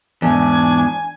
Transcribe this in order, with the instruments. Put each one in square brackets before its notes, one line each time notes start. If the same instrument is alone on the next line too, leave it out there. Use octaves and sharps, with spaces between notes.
[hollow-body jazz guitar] E2 G#2 [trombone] D4 [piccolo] G#5